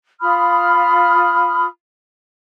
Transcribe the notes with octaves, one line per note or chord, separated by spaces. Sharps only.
F4 B5 D#6 F6